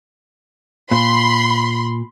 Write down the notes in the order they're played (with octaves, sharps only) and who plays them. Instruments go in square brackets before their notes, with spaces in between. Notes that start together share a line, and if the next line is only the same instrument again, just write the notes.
[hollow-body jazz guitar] A#2 [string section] B5 C6